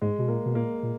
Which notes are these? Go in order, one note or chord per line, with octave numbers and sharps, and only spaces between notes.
G#2 G#3
B2
A#2 A#3
B2
A#2 A#3
A#2